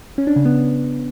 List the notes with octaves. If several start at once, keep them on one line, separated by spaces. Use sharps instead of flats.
C#4
D4
C#3
B3